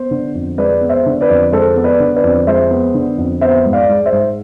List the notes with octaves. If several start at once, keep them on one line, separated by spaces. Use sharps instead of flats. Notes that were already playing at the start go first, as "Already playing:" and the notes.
Already playing: B3 C5
D3
F2
G#3 B4 D5
B3
C5 E5
D3
B4 D5
F2
G#3 A4 C5
B3
B4 D5
D3
B4 D5
F2
G#3 C5 E5
B3
D3
F2
B3 C5 E5
G#2
D5 F5
G#3
C5 E5
G#2